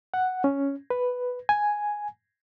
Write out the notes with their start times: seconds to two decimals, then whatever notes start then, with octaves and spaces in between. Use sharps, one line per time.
0.14 F#5
0.44 C#4
0.90 B4
1.49 G#5